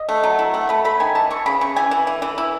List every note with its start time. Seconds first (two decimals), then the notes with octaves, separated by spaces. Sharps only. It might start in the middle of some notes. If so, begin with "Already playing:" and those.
Already playing: D#5
0.09 A3
0.23 F#3
0.39 E4
0.54 A3 F#5
0.69 A3 B5
0.85 A3 B5
1.00 D#3 G#5
1.15 E3 A5
1.31 E3 C#6
1.46 C#3 B5
1.61 C#3 C#6
1.76 E3 G#5
1.91 E3
2.07 E3
2.22 E3
2.38 E4